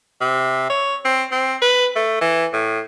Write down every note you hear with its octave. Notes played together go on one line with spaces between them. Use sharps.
C3
C#5
C4
C4
B4
A3
E3
A2